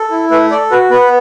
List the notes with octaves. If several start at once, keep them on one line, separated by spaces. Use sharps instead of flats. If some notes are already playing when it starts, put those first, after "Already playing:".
Already playing: A4
E4
A3 B4 E5
A4 D5
F#4 B4
B3 B4